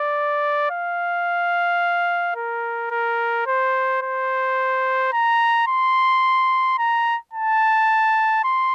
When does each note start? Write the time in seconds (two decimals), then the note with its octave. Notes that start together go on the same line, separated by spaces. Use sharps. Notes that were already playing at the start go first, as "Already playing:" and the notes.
Already playing: D5
0.71 F5
2.36 A#4
2.91 A#4
3.47 C5
4.02 C5
5.13 A#5
5.68 C6
6.78 A#5
7.33 A5
8.44 C6